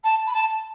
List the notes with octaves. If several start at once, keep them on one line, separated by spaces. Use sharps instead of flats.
A5
B5
A5